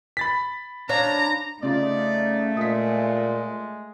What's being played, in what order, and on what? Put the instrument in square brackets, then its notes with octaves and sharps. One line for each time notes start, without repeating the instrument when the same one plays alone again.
[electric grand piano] B5 A6 B6
[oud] D4 C#5 F5 [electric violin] A#5
[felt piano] C#3 F4 [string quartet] A3 [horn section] D#4 D5
[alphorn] A#2 [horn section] G#3 [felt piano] D#6 B6